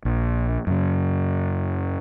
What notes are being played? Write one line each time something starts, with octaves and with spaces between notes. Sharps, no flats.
A#1
F#2 C#3